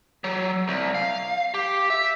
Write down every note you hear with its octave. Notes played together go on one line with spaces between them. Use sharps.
F#3
C2
F5
G4
E5